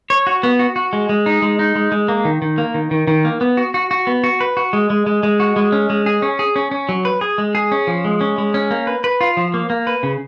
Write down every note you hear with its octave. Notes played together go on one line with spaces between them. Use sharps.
C#5
F#4
B3
F#4
F#4
G#3
G#3
D#4
G#3
D#4
G#3
G#3
A#3
D#3
D#3
A#3
D#3
D#3
D#3
A#3
B3
F#4
F#4
F#4
B3
F#4
B4
F#4
G#3
G#3
G#3
G#3
F#4
G#3
C#4
G#3
G#4
C#4
G#4
C#4
C#4
F#3
B4
G#4
G#3
G#4
C#4
F3
G#3
C#4
G#3
C#4
A#3
B4
B4
F4
F3
A#3
A#3
B4
C#3